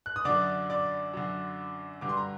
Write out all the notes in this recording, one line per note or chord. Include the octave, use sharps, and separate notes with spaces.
F#6
D#6
F#2 D3 D5 D6
D5 D6
F#2 D3
G2 D3 D6
C6
A#5